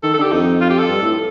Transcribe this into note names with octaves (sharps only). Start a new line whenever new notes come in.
D#3 A4
A4
D3 G4
F2 D#4
F4
G4
A4
G2
A2